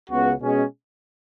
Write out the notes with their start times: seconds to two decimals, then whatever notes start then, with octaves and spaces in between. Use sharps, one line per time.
0.09 C#2 C#3 B3 F#4
0.40 B2 G#3 C#4 G#4